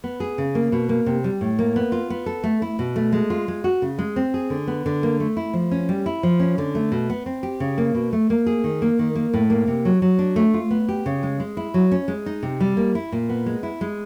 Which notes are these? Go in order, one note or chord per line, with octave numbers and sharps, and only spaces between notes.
B3
G#4
C#3
A#3
B2
A#3
C3
G3
A2
A#3
B3
F4
B3
A4
A3
E4
B2
A3
G#3
F4
G#3
F#4
C#3
G#3
C4
G#4
D3
B3
D3
A#3
A3
E4
F3
C#4
G3
E4
F3
C#4
D3
A3
B2
B3
C4
G4
C#3
A#3
B2
A3
A#3
G#4
D#3
A#3
D#3
A#3
A2
A#3
C3
F#3
F#3
D4
A3
F4
B3
G4
C#3
G#3
G#3
E4
F#3
C#4
G#3
D#4
C3
G3
A#3
E4
A#2
B3
G#3
E4
G#3